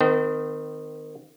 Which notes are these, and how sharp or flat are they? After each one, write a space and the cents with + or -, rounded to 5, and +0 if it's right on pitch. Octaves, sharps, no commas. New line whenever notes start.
D#3 -15 C4 -40